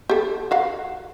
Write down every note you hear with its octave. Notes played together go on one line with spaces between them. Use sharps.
G4 A4
F#4 F5 F#5